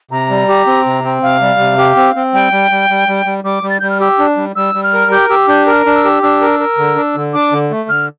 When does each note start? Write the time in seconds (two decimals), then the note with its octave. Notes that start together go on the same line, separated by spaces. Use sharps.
0.11 C3 A#5
0.30 G3
0.49 G4
0.67 C4
0.86 C3
1.04 C4
1.22 C3 F5
1.42 G3
1.60 C3
1.78 G4
1.96 C4
2.16 C4
2.34 G3 G5
2.52 G3
2.71 G3
2.90 G3
3.08 G3
3.26 G3
3.44 G3 D6
3.63 G3
3.70 A6
3.80 G3 G6
3.90 F6
4.00 G4 E6
4.19 D4
4.37 G3
4.56 G3 E6
4.75 G3
4.83 F6
4.93 A#4
5.11 G4 G6
5.29 G4 E6
5.48 D4 G6
5.66 A#4 F6
5.86 D4
5.95 E6
6.05 G4
6.23 D4 E6
6.41 A#4
6.60 A#4
6.78 D3
6.96 D4
7.15 D3
7.33 D4 D6
7.52 D3
7.71 A3
7.89 D3 F6